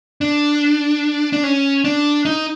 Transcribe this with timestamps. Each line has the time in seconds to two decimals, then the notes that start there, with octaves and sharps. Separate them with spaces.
0.21 D4
1.33 D4
1.44 C#4
1.84 D4
2.25 D#4